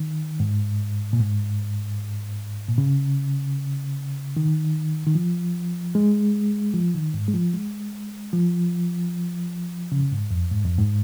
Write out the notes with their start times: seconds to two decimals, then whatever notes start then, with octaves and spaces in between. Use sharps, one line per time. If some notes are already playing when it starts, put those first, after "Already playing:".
Already playing: D#3
0.40 G#2
1.13 A#2
1.20 G#2
2.69 A#2
2.78 C#3
4.37 D#3
5.07 D#3
5.15 F3
5.95 G#3
6.74 F3
6.94 D#3
7.14 G#2
7.28 G#3
7.34 F3
7.54 G#3
8.33 F3
9.92 C#3
10.12 G#2
10.31 F2
10.51 G#2
10.65 F2
10.78 G#2